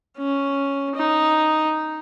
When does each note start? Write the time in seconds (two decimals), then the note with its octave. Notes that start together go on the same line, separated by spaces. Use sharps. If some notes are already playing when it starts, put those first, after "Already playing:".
0.18 C#4
0.96 D#4